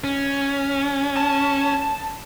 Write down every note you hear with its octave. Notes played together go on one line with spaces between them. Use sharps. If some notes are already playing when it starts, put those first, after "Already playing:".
C#4
A5